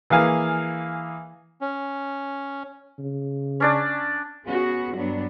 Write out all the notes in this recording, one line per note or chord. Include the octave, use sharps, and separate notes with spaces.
E3 A#3 G#4 F5 G#5
C#4
C#3
C#4 D4 D5
B3 C#4 F#4 G#4
G2 F#3 B3 D4